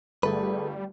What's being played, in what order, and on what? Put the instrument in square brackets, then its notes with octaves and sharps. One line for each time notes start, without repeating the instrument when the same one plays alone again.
[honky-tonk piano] G1 A3 [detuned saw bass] G3 [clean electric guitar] G#4 A4 B4